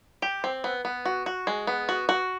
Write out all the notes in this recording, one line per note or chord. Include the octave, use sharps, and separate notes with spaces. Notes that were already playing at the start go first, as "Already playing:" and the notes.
G4
C4
B3
B3
F#4
F#4
G#3
B3
F#4
F#4